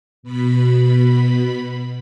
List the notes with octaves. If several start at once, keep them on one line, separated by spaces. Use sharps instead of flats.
B2 B5